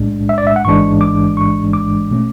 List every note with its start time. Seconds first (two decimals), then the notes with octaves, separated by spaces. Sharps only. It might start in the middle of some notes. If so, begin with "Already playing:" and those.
Already playing: B1 A2 G#3 D4
0.29 E5
0.38 D5
0.47 E5
0.56 F#5
0.65 A1 G#2 E3 G#3 D4 C#6
1.01 D6
1.37 C#6
1.73 D6
2.11 B2 A3 C#4